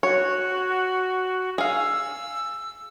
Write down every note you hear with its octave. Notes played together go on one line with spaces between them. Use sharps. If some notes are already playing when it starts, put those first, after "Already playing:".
F#4 C#5
G#4 F5 E6